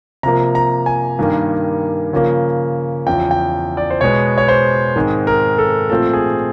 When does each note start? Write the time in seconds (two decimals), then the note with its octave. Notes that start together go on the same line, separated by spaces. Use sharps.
0.23 C3 F3 A#3 A#5
0.55 A#5
0.86 G#5
1.19 G2 D#3 G3 A#3
2.13 C#3 F3 A#3
3.07 E2 C#3 F3 G5
3.31 G5
3.77 D5
3.91 C5
4.01 B2 G#3 B3 C#5
4.38 C#5
4.48 C5
4.96 G#2 D#3 G#3 C4
5.27 A#4
5.58 A4
5.90 A#2 F3 A3 C4 A4
6.13 G#4